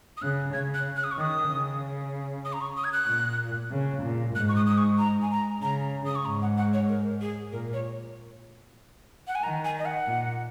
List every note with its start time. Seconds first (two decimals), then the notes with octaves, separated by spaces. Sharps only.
0.17 D#6
0.22 C#3 F#6
0.53 C#3 G#6
0.74 F#6
0.96 F#6
1.04 D#6
1.12 C#6
1.18 D#3 D#6
1.49 C#3
2.45 D#6
2.53 A#5
2.61 C#6
2.77 D#6
2.84 G#6
2.93 F#6
3.08 A#2
3.71 C#3
4.03 A#2
4.35 G#2 F#6
4.49 C#6
4.56 D#6
4.66 D#6
4.78 C#6
4.98 A#5
5.22 G#5
5.31 A#5
5.62 C#3 A#5
6.06 D#6
6.15 C#6
6.25 G#2 A#5
6.42 F#5
6.57 F#5
6.73 C#5
6.89 A#4
7.21 G#4
7.52 A#2 A#4
7.73 C#5
9.27 F#5
9.35 G#5
9.43 D#3 A#5
9.65 G#5
9.79 D#5
9.86 F#5
10.07 A#2